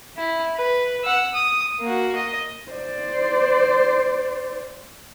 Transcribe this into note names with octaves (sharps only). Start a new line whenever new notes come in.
E4
B4
F#5 E6
D#6
A#3 F#4
D#5
C5 D5